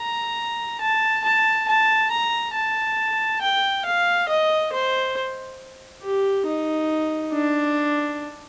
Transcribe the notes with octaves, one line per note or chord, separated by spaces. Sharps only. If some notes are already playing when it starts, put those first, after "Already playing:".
Already playing: A#5
A5
A5
A5
A#5
A5
G5
F5
D#5
C5
G4
D#4
D4